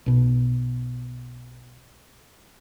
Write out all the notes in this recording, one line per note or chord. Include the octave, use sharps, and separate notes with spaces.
B1 B2